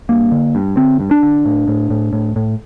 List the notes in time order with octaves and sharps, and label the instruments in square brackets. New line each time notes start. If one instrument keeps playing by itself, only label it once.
[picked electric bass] G2 A#3
D3
G2
D3 C4
G2
D4
D3
A2
A2
A2
A2
A2